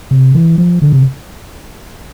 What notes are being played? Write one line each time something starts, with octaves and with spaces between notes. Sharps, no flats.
C3
E3
F3
D3
C3